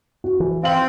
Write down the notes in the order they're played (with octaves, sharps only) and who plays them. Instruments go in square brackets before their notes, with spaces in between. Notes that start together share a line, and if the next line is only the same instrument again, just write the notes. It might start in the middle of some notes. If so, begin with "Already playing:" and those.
[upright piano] F#4
[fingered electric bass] E3
[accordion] C4 [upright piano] F5 F#7